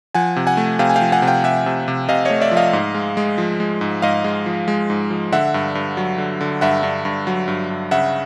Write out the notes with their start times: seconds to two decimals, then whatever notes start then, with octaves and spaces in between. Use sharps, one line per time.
0.15 F3 F#5 G#5
0.36 C3
0.47 F#5 G#5
0.57 A3
0.79 C3 F5 G5
0.89 G#5
0.96 F5 G5
1.01 F3
1.12 F#5 G#5
1.22 C3
1.27 F5 G5
1.44 C3 E5 F#5
1.66 C3
1.88 C3
2.09 C3 D#5 F5
2.25 C#5 D#5
2.30 A3
2.41 D5 E5
2.51 F3
2.57 D#5 F5
2.73 G#2
2.95 G#3
3.17 G#3
3.38 F3
3.60 G#3
3.81 G#2
4.02 G#2 D#5 F5
4.24 G#3
4.46 F3
4.68 G#3
4.90 G#2
5.10 F3
5.32 D3 E5 F#5
5.54 G2
5.75 G2
5.97 F#3
6.18 D3
6.41 D3
6.61 G2 E5 F#5
6.83 G2
7.05 G2
7.27 F#3
7.48 G2
7.70 G2
7.91 C#3 E5 F#5